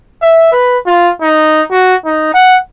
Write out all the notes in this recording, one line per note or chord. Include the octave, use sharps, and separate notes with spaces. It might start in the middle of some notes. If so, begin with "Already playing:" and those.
E5
B4
F4
D#4
F#4
D#4
F#5